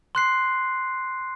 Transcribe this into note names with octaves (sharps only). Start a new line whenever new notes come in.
C6 F#6 C7